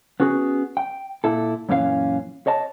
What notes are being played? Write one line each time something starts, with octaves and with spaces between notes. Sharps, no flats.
B3 C#4 F#4 G#4
G5
A#2 E4 A4
F#2 A#2 E3 C#4 A4 F5
C#5 D#5 A5